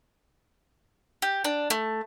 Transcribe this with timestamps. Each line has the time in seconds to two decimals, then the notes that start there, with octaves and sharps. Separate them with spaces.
1.22 G4
1.44 D4
1.70 A3